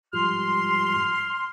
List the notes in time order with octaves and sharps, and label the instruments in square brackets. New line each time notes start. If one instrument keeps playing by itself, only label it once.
[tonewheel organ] G#2 F3 G3 [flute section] C6 [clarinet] F6